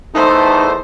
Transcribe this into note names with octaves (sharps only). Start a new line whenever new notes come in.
E2 A3 D#4 C5